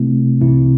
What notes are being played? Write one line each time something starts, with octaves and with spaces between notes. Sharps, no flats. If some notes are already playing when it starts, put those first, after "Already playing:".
Already playing: C3 A3 C4 E4
C2 C3 E3 C4 E4